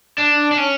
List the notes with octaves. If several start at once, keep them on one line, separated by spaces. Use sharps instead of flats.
D4
D4
C#4